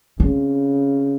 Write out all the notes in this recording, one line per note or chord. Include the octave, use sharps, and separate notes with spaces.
C#3 C4